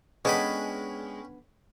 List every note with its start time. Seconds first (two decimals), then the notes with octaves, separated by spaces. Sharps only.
0.25 G#3 B3 C#4 D4 G5 B5